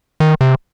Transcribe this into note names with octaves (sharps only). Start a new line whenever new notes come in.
D#3
C3